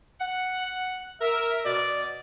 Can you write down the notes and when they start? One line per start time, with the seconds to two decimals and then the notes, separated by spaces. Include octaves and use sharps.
0.21 F#5
1.21 A#4 E5
1.65 B2 D5